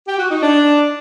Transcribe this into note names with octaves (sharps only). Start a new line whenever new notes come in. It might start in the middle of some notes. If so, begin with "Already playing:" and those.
G4
F#4
D#4
D4